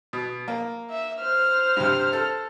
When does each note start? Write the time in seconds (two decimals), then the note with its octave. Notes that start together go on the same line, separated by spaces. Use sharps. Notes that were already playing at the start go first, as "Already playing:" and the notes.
0.13 B2
0.48 A#3
0.90 E5
1.20 C5 F6
1.77 G2 C3
2.13 A4